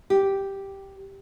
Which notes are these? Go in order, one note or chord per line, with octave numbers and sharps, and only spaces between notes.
G4